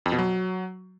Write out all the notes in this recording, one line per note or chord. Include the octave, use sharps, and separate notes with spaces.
F2
B2
F#3